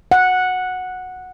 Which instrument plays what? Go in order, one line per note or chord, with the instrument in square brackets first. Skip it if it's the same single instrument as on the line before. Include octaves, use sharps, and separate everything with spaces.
[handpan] F#5